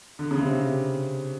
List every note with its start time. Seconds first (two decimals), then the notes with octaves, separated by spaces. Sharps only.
0.19 D3
0.31 C#3
0.41 C3
0.53 C3